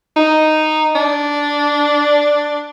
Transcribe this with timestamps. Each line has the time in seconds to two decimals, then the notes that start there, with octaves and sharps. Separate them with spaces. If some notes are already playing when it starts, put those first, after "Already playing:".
0.17 D#4
0.95 D4